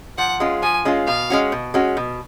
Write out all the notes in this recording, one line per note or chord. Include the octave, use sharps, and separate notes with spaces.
F3 F#5
G#3 C#4 F4
F3 G#5
G#3 C#4 F4
B2 F5
G#3 C#4 F#4
B2
G#3 C#4 F#4
B2